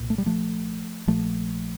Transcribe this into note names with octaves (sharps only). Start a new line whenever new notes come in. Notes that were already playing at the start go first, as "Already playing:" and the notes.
Already playing: C2 A#2
A3
G3
F3 A3
A#1 A#2 F3 A3